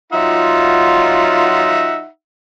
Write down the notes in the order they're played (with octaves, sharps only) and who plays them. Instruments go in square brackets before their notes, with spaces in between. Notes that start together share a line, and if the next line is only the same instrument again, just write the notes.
[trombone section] F#3 F4 [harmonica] D#4 E5 F#5